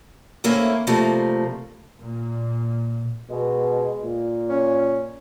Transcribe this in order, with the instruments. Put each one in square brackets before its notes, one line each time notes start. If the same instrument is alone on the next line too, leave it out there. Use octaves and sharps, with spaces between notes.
[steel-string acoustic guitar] D#3 A3 A#3 C4 C#4 E4
C3 F3 G3 A3 A#3
[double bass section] A#2
[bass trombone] B2 [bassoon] G#3
[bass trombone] A#2
[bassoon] C#4